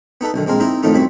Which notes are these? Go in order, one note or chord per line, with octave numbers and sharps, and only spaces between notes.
B3 D#4 A4 B4
B1 D3 D#3
A#1 G#3 C4 A#4 G#5
C4 D#4 E4 A#4
F2 A2 D#3 A3 D#4 F4
C2 F#2 F#3 C4 B5